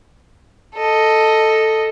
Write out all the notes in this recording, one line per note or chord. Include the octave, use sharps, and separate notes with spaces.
A4 D#5